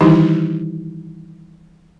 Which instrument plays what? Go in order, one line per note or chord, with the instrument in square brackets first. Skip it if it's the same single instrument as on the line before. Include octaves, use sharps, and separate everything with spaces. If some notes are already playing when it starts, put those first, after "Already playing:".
[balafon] D#3 E3 G3 D#4 E4 G4